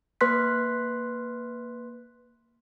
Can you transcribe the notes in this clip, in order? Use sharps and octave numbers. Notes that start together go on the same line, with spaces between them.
A#3 B4 C6 F#6 B6